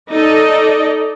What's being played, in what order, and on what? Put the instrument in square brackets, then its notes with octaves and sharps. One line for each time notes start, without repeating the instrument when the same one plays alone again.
[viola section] D#4 A4 D5 D#5